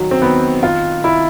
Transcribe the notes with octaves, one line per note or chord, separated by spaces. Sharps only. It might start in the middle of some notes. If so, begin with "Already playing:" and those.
Already playing: D#3 F#3
C4
D#3 B3
D#3 F4
D#3 E4